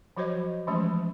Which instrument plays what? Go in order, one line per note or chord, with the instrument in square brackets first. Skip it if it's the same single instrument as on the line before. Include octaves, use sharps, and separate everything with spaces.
[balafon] F3 F#3 F#4 C5 C#5 D#5
E3 F3 G#3 A3 C#4 C#5